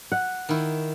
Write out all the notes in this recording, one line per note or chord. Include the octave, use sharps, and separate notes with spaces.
F#5
D#3 E4